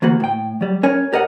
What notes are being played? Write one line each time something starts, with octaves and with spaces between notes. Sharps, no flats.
D2 E3 A#3 F#4
A2 G5
F#3 G3
C#4 A#4 C#5 G#5
G4 A#4 D#5 F#5